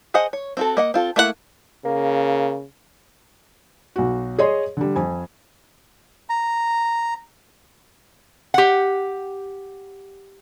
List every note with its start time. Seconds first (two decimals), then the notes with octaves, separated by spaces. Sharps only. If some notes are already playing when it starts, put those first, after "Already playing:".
0.14 G#4 C5 D#5 F#5
0.33 C#5
0.57 C4 F#4 A4
0.77 A#3 D#5 F#5
0.94 C4 F4 A4
1.16 A3 A#3 E4 F4 F#5
1.85 C#3 A#3
3.96 B1 F#4
4.39 G#4 C#5 D#5 C6
4.77 D3 G3
4.96 F2 G#5
6.30 A#5
8.54 G4 F#5